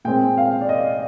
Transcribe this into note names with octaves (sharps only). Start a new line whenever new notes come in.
A#2 G#3 C4 G5
F5
D5
D#5